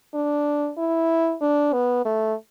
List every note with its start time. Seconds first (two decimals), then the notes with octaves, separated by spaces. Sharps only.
0.14 D4
0.78 E4
1.41 D4
1.73 B3
2.05 A3